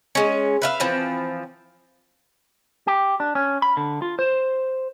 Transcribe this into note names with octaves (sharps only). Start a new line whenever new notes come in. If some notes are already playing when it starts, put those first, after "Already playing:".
G#3 C#4
B4 E5 F5
E3 F3 C4
G4
D4
C#4
B5
D3
F4
C5